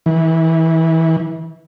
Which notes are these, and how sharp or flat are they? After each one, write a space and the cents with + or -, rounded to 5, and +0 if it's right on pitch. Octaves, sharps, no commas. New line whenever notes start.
E3 -25